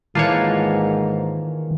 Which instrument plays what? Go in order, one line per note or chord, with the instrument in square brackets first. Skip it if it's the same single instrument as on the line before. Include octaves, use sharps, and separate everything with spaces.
[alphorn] G#2 [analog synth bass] D#3 [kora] E3 A#3 D4 [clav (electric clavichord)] F4 C5 C#5